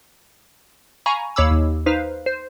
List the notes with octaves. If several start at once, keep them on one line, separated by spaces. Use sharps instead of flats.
F5 G#5 A#5 B5 C#6
D#2 C#5 F5 B5 D6 E6
D#2
D#4 B4 C5 F5
C5